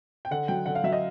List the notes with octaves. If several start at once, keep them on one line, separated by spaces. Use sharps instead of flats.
G5
D3 F#5
F#3 G5
D3 F#5
F5
F#3 E5
D#5